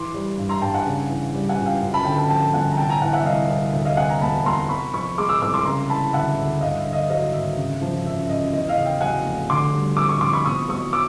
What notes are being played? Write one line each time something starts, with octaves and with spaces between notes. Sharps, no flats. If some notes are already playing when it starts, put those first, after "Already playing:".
Already playing: E3 C6 D6
G3
G2
A#5 C6
G2 G5 A5
F#5 G#5
C#3
E3
G3
F#5 G#5
C#2
F5 G5
F#2
A5 B5
D3 G5 A5
A5 B5
F3 G5 A5
G1 F#5 G#5
A#5
C3 G5 A5
G#5 A#5
E3 F#5 G#5
E5 F#5
C2 D#5 F5
C2
D2 E5
D#5 F5
C3 F#5 G#5
G#5 A#5
E1 A5 B5
E1 A#5 C6
C3 B5 C#6
F3 B5 C#6
G#3 C6 D6
D6 E6
C2 D6 E6
C6 D6
C#3 A#5 C6
E3 A5 B5
D2 E5 F#5
D2 E5
G2 D#5 F5
E5
D3
D#5 F5
F#3 D#5 F5
G#1 E5
C#3
F3
F#2 E5
F#2 D#5
E2 D#5
D#5 F5
C#3
F5 G5
F#3 F#5 G#5
F1
D3 C6 D6
G3
F2 D6 E6
C#6 D#6
F2 C6 D6
B5 C#6
B2 C#6 D#6
F#3 C#6 D#6
D6 E6